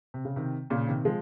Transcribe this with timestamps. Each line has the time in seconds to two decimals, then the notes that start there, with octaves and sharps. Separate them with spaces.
0.14 C3
0.25 C#3
0.36 C3 D#3
0.70 A#2 C#3
0.87 C3 D#3
1.05 F3 G#3